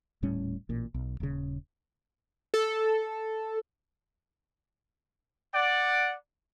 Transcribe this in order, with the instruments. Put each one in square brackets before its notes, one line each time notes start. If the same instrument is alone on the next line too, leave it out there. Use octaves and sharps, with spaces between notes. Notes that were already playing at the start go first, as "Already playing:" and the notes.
[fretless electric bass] D#1 A2 G3 C#4
A1 A#2
B1
D#1 C#3
[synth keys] A4
[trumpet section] D5 F#5